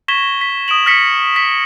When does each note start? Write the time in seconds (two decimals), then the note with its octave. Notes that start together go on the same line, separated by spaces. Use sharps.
0.08 C#6 G#6 A#6 B6 E7 G7
0.41 B6
0.68 D#6 D7 E7 F#7
0.86 F6 A#6 B6 C#7
1.36 B6